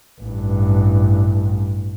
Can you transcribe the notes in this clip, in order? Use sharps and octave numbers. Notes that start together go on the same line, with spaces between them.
A1 G2